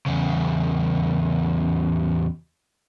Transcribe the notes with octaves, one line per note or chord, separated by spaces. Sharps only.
E2 C#3